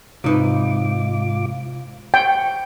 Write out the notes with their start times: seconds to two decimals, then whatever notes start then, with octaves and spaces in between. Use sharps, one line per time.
0.24 G#2 C3 D#4 F4 B4 D6
2.14 G5 C#6